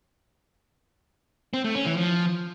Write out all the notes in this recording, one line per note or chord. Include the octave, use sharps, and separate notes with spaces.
C4
A3
C#4
E3
F3